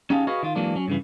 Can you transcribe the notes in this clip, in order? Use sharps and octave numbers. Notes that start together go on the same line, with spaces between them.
C#4 D#4 G4 G#4 F5 A5
F#4 G#4 B4 C#5 D#5 F5
D#3 F4
E3 F#3 G#3 A#3 D4
F#3 C#4
G2 C#3 E3